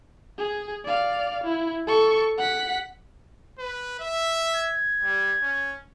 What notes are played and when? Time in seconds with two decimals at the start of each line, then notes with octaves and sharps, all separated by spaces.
0.38 G#4
0.85 D5 F5
1.44 E4
1.87 A4 C#6
2.38 F#5 B6
3.59 B4
4.00 E5
4.56 G#6
5.03 G3
5.42 C#4